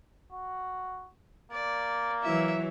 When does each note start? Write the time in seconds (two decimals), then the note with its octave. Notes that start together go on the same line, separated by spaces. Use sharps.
0.32 F#4
1.52 A#3 D5
2.23 E3 F#3 E4 E5